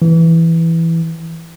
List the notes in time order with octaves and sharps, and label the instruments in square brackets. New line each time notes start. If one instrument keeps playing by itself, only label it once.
[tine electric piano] E3